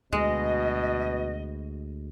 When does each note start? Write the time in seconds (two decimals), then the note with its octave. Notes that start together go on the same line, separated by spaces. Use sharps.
0.13 D2 B2 G#3 D#5